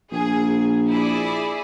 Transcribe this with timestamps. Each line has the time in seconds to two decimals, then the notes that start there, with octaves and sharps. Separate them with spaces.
0.12 A#1 G#4
0.88 E4 G#4 D5